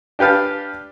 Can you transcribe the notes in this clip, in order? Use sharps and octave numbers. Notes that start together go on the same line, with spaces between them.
D4 G4 B4 F5 A5